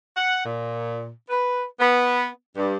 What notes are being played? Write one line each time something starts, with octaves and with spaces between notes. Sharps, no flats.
F#5
A#2
B4
B3
G2